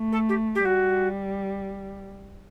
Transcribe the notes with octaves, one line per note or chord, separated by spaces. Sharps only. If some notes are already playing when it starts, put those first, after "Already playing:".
Already playing: A3
A4
G4
G4
G3 F#4